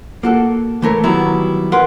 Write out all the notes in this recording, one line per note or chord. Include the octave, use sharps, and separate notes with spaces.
A#3 F#4 A4
E3 A3 A#4 C#5
D#3 F#3 G3 B3 E4
E2 A#4 B4 F#5 C6